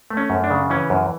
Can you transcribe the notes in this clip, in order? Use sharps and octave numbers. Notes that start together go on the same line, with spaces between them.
A3
C#4
F#2
D4
C#3
E3 C#4
F#2